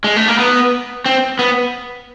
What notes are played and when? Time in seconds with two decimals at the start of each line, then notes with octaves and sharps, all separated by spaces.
0.04 G#3
0.16 A3
0.28 A#3
0.39 B3
1.06 C4
1.39 B3